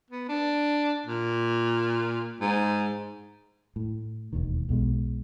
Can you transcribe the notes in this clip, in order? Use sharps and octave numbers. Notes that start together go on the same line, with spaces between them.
B3
D4
A#2
G#2
A2
E1 D#2 D#3
B1 B2 G#3